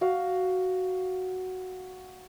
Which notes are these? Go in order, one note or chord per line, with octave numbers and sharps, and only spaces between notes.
F#4 F5